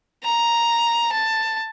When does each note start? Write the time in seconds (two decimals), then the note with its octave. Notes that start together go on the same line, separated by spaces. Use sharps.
0.24 A#5
1.12 A5